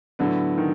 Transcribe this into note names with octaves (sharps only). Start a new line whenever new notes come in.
A2 D3 F#3 B3
D#3